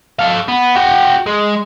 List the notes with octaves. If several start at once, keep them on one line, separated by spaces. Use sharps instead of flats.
A4 F5
B3
F#4 G5
G#3